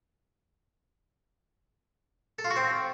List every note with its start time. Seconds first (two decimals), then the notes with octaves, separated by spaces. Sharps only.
2.39 A4
2.44 F4
2.50 F#4
2.56 C4